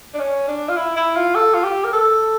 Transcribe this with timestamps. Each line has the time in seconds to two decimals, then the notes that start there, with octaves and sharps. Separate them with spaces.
0.14 D4
0.19 C#4
0.48 D4
0.69 F4
0.77 E4
0.96 E4
1.16 F4
1.35 A4
1.54 F4
1.64 G4
1.84 A#4
1.93 A4